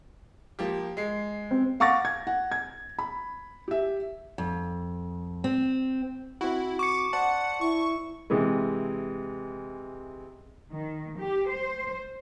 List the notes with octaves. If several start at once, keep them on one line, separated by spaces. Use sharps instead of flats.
F3 A#3 G4
G#3 C7
C4
F5 F#5 C#6 D6 A6 A#6
G#6
F#5
G#6
B5
G4 E5
F2
C4
C4 E4 F#4
C#6 D6 C#7
C5 D5 F#5 A5
E4 C#6
C3 E3 G#3
D#3
G4
C5